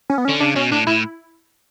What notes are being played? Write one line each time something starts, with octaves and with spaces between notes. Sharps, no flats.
C#4
B3
C#4
D3
C#3 D4
B2 C#4
A2 D4
A2 E4